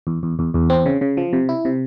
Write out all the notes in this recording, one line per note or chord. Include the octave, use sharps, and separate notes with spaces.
E2
E2
E2
E2
C4
C#3
C#3
F3
C3
E4
C3